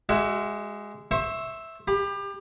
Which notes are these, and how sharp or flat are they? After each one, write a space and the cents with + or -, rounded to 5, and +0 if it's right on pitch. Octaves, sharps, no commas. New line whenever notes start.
G#3 -5 F#4 +30 E5 +20
C5 +25 E5 -5 C#6 +0
G4 +30 B5 +0